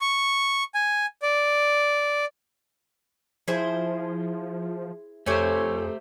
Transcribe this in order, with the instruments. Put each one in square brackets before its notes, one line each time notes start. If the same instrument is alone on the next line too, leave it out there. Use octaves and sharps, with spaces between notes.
[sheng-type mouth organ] C#6
G#5
D5
[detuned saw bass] F3 [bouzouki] E4 G#4 C5
[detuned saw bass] F2 [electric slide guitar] A3 G4 C5 [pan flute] A4 [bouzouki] C#5 G#5